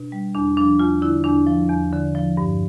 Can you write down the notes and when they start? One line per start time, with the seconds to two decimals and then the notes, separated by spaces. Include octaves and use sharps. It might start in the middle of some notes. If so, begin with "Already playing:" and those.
Already playing: B2 D4
0.12 G3
0.35 E2 D4
0.57 F3 D4
0.79 E2 F4
1.02 D3 E4
1.24 E2 D4
1.47 F3
1.69 E2
1.93 D3
2.15 F3
2.37 G2